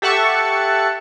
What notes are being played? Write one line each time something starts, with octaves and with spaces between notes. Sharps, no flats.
G4 A4 E5 F#5 A5 C#6